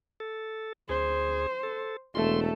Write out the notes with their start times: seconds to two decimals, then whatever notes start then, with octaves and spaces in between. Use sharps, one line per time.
0.20 A4
0.89 D2 G#4 C5
1.63 A4
2.15 E1 A3 A4 C6